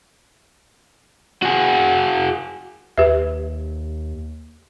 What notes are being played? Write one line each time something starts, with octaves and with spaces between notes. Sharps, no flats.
F#4 G#4
D#2 G4 B4 E5